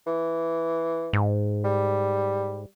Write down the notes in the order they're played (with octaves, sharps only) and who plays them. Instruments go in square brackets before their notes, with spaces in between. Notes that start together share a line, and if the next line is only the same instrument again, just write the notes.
[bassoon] E3
[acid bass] G#2
[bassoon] G3